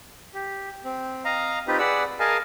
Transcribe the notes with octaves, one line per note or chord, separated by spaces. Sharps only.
G4
C4
D#5 F5 A#5
C4 D#4 F4 G4 B4
G#4 B4 D5 F#5 E6
G#4 A#4 D#5 F5 G#5 A5